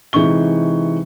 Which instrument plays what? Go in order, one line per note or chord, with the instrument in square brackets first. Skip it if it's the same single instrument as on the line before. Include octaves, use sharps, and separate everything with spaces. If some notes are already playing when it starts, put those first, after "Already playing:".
[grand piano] C3 E3 G#3 D#4 C#6 G7